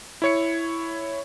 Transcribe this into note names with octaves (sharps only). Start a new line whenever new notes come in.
E4 C#5 C#7